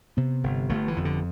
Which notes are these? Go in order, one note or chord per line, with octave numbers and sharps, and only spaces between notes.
C3 B3
G1
G1 A3
E3
F2
D3